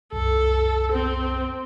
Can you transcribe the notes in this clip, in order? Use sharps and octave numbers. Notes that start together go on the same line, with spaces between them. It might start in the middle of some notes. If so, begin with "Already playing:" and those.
C2 F#2 A4
C4